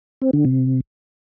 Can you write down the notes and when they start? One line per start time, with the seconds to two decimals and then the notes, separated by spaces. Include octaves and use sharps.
0.22 C4
0.33 D3
0.45 C3